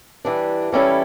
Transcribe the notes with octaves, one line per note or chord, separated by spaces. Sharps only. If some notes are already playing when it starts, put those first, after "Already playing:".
E3 G3 D4
E3 G3 C#4 E4 A4